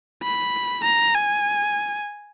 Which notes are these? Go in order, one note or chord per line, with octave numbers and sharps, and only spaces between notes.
B5
A#5
G#5